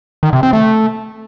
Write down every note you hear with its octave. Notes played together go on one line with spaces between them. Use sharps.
D#3
C3
C4
A3